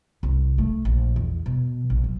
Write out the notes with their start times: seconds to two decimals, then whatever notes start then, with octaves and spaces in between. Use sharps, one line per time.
0.23 C2
0.58 A3
0.85 A#1
1.16 E2
1.46 B2
1.90 A#1
2.04 F#3